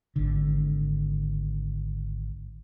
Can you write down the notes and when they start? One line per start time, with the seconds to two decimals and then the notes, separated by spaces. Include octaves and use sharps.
0.16 G#1 D3